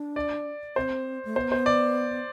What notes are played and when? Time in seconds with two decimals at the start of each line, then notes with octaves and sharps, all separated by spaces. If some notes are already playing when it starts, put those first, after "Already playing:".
Already playing: D4
0.16 D5
0.76 C4 C5
1.25 A3
1.36 B3 C5
1.52 C5
1.66 D5